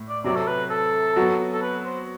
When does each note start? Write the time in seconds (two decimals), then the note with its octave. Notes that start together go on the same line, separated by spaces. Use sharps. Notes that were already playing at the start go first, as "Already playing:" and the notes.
Already playing: A2
0.09 D5
0.24 C3 F#3 C4 D5
0.36 A4
0.48 B4
0.70 A4
1.16 F#3 B3 F#4
1.53 A4
1.62 B4
1.85 C5